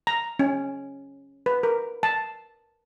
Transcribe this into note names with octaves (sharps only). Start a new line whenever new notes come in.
A#5
C#4
B4
A#4
A5